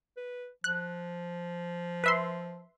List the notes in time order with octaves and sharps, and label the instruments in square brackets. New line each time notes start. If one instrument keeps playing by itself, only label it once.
[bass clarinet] B4
[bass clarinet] F3 [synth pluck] F#6
[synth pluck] B4 E5 C6